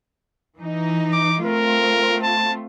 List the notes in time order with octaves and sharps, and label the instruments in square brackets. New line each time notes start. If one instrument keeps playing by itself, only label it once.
[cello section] E3 D#4
[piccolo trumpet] D6
[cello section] A3 C4 F4 [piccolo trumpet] A#4
[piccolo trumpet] A5